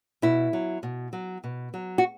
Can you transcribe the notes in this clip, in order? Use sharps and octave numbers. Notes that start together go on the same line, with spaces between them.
B2 E4
F#3
B2
F#3
B2
F#3
F#4